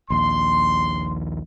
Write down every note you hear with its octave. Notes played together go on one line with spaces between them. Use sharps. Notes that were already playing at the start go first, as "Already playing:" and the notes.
A#1 D#2 C6